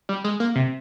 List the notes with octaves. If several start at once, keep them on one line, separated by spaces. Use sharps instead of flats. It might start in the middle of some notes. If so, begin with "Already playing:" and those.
G3
G#3
A#3
C3